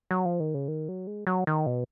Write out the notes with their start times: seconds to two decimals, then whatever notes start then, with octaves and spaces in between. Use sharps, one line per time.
0.11 F#3
0.25 F3
0.40 D#3
0.54 C#3
0.68 D#3
0.88 F#3
1.07 G#3
1.27 F#3
1.47 D#3
1.66 B2